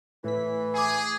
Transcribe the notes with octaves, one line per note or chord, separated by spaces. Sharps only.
A2 E3 B6
G#4 G#5 D6